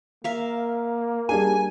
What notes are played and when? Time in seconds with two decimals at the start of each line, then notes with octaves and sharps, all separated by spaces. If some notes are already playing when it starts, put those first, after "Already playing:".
0.24 A#3 A#4 E5 F5
1.29 G3 D4 G#4 G#5